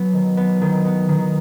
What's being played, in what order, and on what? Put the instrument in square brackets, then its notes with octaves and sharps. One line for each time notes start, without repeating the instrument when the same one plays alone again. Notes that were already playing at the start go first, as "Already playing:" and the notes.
Already playing: [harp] F#3 B3
D#3
B3
D#3
B3
D#3